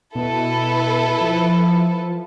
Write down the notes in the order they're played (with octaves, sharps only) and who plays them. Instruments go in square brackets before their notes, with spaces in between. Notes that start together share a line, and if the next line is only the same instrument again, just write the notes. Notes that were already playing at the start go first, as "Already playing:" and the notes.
[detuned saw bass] B2 [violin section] E4 A4 B4
[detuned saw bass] F3